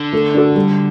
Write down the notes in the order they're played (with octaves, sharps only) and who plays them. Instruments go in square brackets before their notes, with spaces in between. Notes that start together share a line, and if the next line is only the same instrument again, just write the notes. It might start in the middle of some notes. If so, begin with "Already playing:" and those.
Already playing: [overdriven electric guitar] D3
[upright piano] A3
D4 F#4 A4
G3